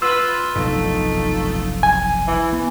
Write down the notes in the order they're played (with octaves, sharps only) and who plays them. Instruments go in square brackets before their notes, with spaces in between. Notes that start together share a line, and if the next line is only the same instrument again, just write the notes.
[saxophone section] F4 B4 [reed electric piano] E6
[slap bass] F1 B1 G2 [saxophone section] A3 D#4 F4
[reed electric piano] G#5
[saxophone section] E3
[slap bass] B3